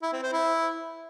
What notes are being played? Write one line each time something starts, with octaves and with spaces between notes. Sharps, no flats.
E4
C4
C5
E4